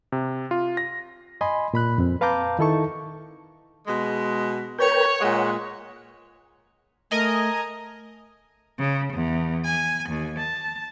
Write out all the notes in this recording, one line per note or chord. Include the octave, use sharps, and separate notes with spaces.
C3
F4
A#6
D#5 G#5 B5 C6
A#2 B5 F#6
F2 C4
B4 F5 A5 A#5 D6 G6
D#3 D#4 E4 A4 A5 C#6
B2 G#3
A#4 B4 C#5 G5
A#2 G#3 C#5 F#5
A3 A#4 D#5 G#5
C#3
E2
G#5
D#2
A5